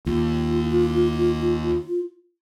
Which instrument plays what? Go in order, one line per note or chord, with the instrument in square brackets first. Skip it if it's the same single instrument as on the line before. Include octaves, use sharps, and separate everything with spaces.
[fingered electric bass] D#2 [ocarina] F4